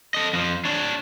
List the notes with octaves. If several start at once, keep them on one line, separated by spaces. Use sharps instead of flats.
A4 D#5
F2 F3
D4 C#5